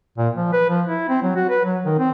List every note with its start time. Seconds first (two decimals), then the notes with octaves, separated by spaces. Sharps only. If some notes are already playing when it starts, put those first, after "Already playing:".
0.18 A#2
0.36 F3
0.53 B4
0.69 F3
0.87 E4
1.09 C4
1.22 F#3
1.36 F#4
1.50 B4
1.65 F#3
1.86 D#3
1.98 C4